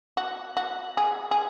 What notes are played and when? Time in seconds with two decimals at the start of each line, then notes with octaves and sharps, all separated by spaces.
0.17 F#4
0.57 F#4
0.97 G#4
1.31 G#4